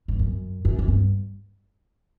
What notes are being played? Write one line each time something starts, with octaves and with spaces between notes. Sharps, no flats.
G2
F#2
F#2
G#2
G2